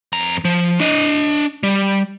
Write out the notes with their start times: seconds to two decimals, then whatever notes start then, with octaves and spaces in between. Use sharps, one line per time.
0.13 F2 A#5
0.45 F3
0.80 D4 D#5
1.63 G3